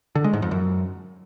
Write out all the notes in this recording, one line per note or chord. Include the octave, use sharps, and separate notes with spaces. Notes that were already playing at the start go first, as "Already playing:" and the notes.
D3
G#3
G#2
F2
F#2